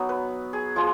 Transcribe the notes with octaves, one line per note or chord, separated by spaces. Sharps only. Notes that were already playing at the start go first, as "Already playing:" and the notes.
Already playing: F#3 B3 D#4
B4
G#4
F3 G#3 G#4